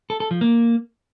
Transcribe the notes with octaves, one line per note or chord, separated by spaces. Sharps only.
A4
A4
F3
A#3